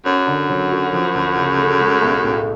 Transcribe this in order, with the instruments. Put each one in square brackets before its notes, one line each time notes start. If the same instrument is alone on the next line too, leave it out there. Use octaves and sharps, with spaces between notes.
[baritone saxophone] F#2 [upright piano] C#4
[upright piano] D3
F#3
F#4
F3
D2
C#3
A3
G#3
B1
A2